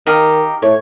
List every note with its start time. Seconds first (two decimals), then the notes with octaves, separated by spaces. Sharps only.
0.07 D#3 D#4 G4 F5
0.62 A2 C#5